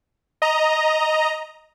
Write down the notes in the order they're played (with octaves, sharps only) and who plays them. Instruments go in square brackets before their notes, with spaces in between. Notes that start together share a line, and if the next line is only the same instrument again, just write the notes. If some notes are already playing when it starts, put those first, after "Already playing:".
[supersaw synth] D#5 A#5